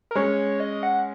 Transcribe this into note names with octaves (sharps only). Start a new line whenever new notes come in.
A#4
G#3 C#4 C#5
D#5
F#5